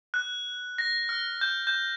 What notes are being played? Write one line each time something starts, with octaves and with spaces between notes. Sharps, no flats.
F#6
A#6
F6
G6
G6